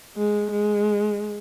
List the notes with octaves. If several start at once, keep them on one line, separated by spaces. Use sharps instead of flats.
G#3
G#3